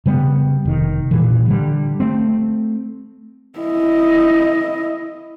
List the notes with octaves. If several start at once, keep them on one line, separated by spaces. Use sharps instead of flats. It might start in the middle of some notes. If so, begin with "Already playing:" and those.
C#3 G3 A3 B3
F1 D#3
G2 A#2 E3
D3 G3
A3 C4
E4 D#5